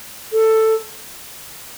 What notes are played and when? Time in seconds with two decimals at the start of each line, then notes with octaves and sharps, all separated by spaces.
0.33 A4